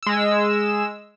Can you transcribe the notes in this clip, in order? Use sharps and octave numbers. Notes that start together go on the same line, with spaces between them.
G#3 E6